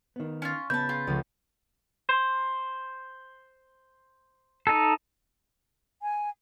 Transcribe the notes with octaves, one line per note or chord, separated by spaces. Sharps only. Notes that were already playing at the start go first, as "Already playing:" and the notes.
D#3 B3
C#4 E4 F4
C#3 B3 E5 A5 B5 G6
F4 G#4
C#2 F3 A3
C5
D#4 A4
G#5